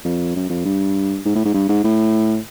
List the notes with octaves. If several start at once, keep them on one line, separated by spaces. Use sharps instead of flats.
F2
F#2
F2
G2
G#2
A2
G#2
G2
G#2
A2